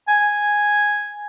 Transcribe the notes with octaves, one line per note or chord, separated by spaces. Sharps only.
G#5